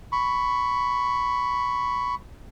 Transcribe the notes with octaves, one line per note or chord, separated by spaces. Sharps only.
B5 C#6